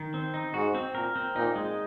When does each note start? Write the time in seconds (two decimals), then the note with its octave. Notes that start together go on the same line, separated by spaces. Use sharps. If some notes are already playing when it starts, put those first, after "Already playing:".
Already playing: D#3
0.14 C4
0.34 D#4
0.54 G#2 F#4
0.75 C4
0.95 A#2 A#4
1.16 C4
1.36 A#2 D#4
1.56 G#3